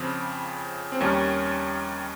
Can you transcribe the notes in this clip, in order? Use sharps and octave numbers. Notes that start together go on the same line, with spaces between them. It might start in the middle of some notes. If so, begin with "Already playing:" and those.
Already playing: F2 C#3 F3 C4
C4
D#2 D#3 G3 C#4